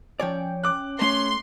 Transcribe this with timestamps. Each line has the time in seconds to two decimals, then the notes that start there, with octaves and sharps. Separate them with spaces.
0.20 F3 C#4 C#5 D5 G5
0.64 D6 F#6
1.02 A3 C#4 C6